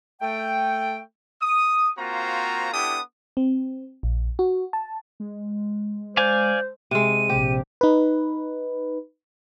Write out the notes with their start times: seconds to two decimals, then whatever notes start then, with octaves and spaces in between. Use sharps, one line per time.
0.21 A3 G5
1.41 D#6
1.97 A#3 C4 F4 F#4 C5 A#5
2.73 B3 D4 E4 G4 A4 D#6
3.37 C4
4.03 A#1
4.39 F#4
4.73 A5
5.20 G#3
6.17 C5 D5 F5 G#5
6.91 C3 G#3 D#7
7.29 A#1 C3 G4
7.81 D#4 B4